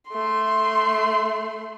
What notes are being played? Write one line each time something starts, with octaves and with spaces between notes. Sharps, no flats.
A3 C6